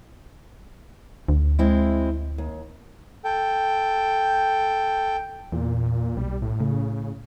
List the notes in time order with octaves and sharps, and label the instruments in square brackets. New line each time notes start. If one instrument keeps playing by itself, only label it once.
[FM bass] D2
[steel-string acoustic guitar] G#3 C4 E4
D#2
[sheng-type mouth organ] A4 G5
[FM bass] E2 [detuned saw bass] A#2
[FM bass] B1 [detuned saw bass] G3
[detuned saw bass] A2
[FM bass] A2 [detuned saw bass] C#3